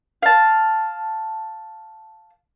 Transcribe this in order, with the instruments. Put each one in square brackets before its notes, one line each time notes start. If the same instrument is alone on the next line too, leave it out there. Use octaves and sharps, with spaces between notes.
[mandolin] F5 A5